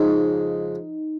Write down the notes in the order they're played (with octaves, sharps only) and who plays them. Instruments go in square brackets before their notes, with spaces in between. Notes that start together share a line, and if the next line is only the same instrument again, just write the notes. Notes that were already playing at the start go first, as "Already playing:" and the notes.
Already playing: [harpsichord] F2 C#3 G#3 [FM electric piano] D#4